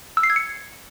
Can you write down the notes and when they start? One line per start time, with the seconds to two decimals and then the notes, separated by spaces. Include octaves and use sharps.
0.17 E6
0.23 C7
0.30 G#6
0.36 C#7